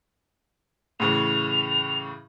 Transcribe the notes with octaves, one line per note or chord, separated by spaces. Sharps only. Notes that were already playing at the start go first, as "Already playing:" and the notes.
A2 C#3 E3 F7